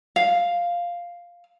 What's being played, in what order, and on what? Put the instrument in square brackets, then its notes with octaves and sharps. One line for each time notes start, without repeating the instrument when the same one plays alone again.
[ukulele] F5